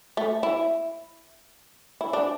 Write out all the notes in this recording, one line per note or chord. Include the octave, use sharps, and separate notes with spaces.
A3
E4
E4
D4